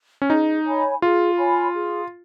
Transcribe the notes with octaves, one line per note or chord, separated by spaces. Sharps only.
C#4
D#4 G#4
C#5 G#5 B5
F4 G#4
C#5 G#5 B5
G#4